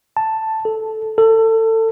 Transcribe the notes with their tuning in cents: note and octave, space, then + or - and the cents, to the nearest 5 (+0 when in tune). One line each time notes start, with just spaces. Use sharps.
A5 +5
A4 -10
A4 +25